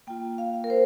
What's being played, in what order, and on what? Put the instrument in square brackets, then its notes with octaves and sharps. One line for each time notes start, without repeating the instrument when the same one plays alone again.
[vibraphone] A#3 F4 G5
F5
A#4
C5